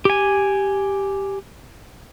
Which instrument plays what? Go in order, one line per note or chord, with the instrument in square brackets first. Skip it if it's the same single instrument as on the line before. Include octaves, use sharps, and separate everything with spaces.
[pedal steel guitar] G4 G#5